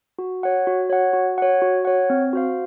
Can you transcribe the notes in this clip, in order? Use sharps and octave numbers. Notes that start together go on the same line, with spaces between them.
F#4
C#5 F#5
F#4
C#5 F#5
F#4
C#5 F#5
F#4
C#5 F#5
C4
F#4 C5 F5